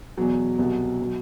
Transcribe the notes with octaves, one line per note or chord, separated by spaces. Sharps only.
E2 B2 F#3
C2 B2 F#3
B2 F#3